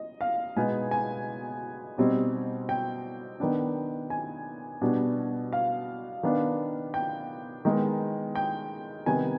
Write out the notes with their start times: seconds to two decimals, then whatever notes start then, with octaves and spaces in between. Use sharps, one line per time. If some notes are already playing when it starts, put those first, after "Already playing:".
Already playing: D#5
0.21 F5
0.56 B2 G#3 B3 D#4 G#5
0.91 G#5
1.98 B2 G3 C4 D#4
2.69 G5
3.40 D#3 B3 D4
4.10 G#5
4.82 B2 G3 B3 D4
5.53 F5
6.23 D#3 B3 D4
6.94 G5
7.65 D#3 G#3 B3
8.35 G5
9.06 C3 D#3 G3 B3 G#5